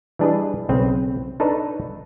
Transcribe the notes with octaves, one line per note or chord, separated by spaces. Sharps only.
E3 G3 D4 G#4 B4 D#5
B1 C#3 C4 B4
D4 D#4 A4 B4 C#5